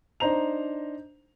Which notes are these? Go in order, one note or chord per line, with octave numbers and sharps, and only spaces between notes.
D4 D#4 C5 A#5 F7